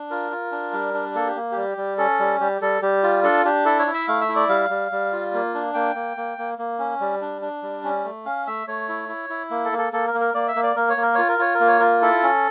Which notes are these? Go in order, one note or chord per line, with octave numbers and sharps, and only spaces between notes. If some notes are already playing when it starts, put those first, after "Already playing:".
Already playing: D4
F4 A#4
F4
D4
G3
D4
A#3 A4
G4
A#3
G3 G4
G3
C#4 A4
G3
G3 G4
G3 A4
G3 G4
F4
D4 A4
D4 G4
E4 A4
C#5
E4
E5
A3 F5
E5
E4
D5
G3 F5
G3
G3
F4
A#3
D4
A#3 G5
A#3
A#3
A#3
A#3
C#4
G3
D4
D4
G3
C#4
A3
C#4 F5
A3 E5
A3 C#5
E4
E4
E4
A#3
A4
A#3
A4
A#3 A4
A#4
A#3
A#4
A#3 D5
E5
A#3
D5
A#3 A#4
C#5
A#3
A#4
F4 C#5
A#4
F4 C#5
A#4
A#3
C#5
F4 A#4
E4 A4
C#4